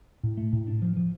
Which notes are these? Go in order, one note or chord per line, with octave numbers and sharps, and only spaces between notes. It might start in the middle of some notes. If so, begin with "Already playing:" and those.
A2
A3
A2
D4
F3
F3